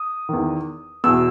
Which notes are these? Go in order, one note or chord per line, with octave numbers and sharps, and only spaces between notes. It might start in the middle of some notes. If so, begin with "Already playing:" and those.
Already playing: D#6
E2 D#3
E2 B2 E6